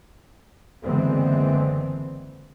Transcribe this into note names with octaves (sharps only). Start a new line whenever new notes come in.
F#1 D3 E3 G#3 B3 C4